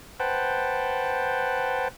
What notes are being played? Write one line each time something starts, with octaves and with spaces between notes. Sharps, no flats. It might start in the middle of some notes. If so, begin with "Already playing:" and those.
B4 C5 F#5 G5 A5